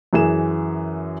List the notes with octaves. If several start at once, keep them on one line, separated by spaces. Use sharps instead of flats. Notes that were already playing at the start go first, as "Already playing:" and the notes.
F#2 E3 G#4 E7